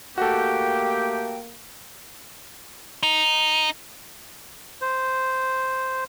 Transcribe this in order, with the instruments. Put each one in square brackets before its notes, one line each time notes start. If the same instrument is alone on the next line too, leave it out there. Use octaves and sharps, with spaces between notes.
[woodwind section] A3 G4 G5 [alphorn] A#3 [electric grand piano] F#4 A4
[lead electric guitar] D#4
[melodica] C5